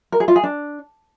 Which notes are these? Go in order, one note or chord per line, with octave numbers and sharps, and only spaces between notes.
A#4
G#4
F4
G#4
D4